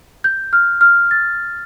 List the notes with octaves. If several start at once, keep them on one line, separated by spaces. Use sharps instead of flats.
G6
F6
F6
A6